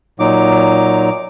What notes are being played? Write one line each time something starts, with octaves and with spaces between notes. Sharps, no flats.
A#2 F#3 D#4 D6